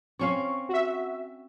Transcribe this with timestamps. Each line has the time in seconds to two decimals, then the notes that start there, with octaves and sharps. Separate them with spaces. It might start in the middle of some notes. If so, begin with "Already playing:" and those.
0.19 C4 C#4 F5 C#6
0.69 F#4 E5